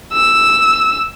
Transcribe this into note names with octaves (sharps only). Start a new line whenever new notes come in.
E6